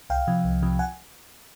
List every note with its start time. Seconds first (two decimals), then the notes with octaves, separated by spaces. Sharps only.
0.10 C2 F5 G5
0.27 C3 F3
0.44 C2
0.62 C3 F3
0.79 F#5 G#5